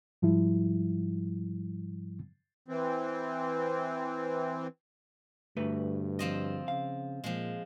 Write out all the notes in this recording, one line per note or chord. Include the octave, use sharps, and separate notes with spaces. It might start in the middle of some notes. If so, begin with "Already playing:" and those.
G#2 F3 G3 E4
E3 C4
D2 G2 A3 B4
F3 C4 D#5
C#3 F5
A#2 F3 G#3